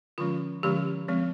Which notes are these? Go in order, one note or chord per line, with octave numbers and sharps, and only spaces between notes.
D3 F3 G#3 C#4 F4
D3 F3 G#3 C#4 G4
F3 G#3 C4